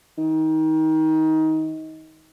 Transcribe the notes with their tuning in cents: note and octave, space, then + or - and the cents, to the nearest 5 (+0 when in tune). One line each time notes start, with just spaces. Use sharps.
D#3 +25